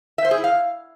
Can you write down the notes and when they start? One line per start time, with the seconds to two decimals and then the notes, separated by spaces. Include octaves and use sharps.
0.18 E5
0.25 C5
0.31 G#4
0.37 E4
0.44 F5